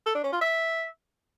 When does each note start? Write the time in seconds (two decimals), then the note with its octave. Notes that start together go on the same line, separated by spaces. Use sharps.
0.06 A4
0.15 D4
0.24 C#4
0.32 F4
0.41 E5